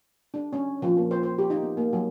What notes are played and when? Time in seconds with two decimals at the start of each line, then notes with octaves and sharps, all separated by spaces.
0.34 D4
0.53 C#4
0.82 F3
0.97 A#3
1.11 C5
1.23 C5
1.38 G4
1.50 D#4
1.63 B3
1.77 A#3
1.93 F#3